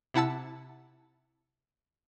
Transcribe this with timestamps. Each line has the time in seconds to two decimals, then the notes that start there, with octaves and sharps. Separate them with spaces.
0.14 C3 E4 F#5 A5 E6